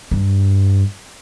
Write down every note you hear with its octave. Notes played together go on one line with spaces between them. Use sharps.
G2